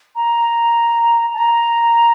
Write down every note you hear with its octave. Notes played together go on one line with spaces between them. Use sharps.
A#5
A5
A#5